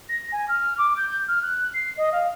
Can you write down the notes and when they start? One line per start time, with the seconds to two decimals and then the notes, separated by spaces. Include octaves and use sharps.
0.09 A#6
0.32 G#5
0.48 F6
0.78 D6
0.97 G6
1.28 F6
1.42 F#6
1.74 C7
1.97 D#5
2.12 F5